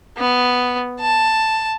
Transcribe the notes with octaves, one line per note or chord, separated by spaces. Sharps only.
B3
A5